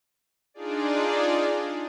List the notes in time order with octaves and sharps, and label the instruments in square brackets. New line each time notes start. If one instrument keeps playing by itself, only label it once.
[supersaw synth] D4 D#4 F4 G#4 D5